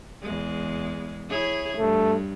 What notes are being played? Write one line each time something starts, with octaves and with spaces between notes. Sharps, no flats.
E2 G#3
E4 G#4 C#5
G2 A3